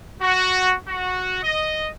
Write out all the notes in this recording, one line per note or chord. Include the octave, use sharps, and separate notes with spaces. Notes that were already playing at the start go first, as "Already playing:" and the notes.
F#4
F#4
D#5